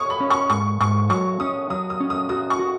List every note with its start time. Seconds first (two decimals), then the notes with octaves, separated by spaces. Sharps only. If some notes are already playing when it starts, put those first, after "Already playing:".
Already playing: C#5 C#6 D#6
0.10 B5
0.20 C#4
0.30 C#6
0.50 G#2 C#6
0.81 G#2 C#6
1.09 F#3 C#6
1.40 C#4 D#6
1.70 F#3 D#6
1.90 D#6
2.00 C#4
2.10 D#6
2.29 F#4 D#6
2.50 C#6
2.59 F#4